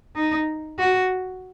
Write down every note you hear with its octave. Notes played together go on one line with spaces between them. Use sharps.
D#4
F#4